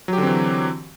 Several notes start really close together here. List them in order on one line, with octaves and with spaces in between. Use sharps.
F#3 G4 D3 C4 E3